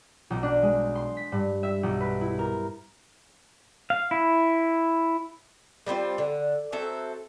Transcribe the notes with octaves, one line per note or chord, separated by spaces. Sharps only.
B1
D4
G#3
C6
B6
G2
E5
B1
B4
E4
A#4
F5
E4
G3 A3 C4 F4
D3
F#3 C4 A4 E5